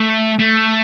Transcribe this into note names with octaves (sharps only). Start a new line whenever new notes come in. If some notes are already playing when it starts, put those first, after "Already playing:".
Already playing: A3
A3